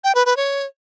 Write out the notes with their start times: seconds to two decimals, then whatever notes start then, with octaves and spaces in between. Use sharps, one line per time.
0.04 G5
0.15 B4
0.26 B4
0.37 C#5